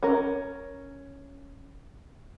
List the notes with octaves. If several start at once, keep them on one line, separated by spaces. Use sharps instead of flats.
C#4 A#4